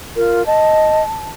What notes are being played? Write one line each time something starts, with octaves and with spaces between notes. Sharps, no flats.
F4 A#4
D#5 A5